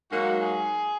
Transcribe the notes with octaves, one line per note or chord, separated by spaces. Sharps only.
G#2 F#3 A#3 F#4
G#4